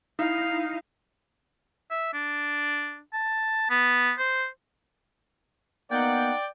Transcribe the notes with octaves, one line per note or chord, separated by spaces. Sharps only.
D#4 E4 F5
E5
D4
A5
B3
C5
A#3 B3 D#4 D5 F#5 G5